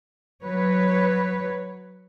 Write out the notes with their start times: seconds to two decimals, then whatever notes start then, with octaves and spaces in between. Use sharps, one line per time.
0.44 F#3 B4 C#5